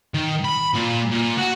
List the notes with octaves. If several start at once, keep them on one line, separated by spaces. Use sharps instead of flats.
D#3
B5
A#2
A#2
F#4